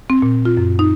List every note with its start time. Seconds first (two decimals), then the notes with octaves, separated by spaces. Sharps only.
0.10 C4
0.22 A#2
0.45 F4
0.57 F#2
0.79 D#4